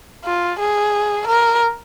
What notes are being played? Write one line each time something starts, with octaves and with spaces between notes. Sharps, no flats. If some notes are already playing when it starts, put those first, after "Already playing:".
F4
G#4
A#4